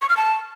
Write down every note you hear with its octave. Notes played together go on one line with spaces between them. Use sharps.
C#6
F6
A5